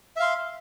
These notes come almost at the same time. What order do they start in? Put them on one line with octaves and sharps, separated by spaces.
E5 F5 C6